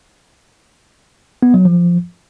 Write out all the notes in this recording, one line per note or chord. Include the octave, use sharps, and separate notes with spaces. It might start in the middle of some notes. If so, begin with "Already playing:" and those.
B3
F#3
F3